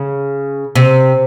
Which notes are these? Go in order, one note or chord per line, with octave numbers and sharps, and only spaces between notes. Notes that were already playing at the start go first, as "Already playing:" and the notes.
Already playing: C#3
C3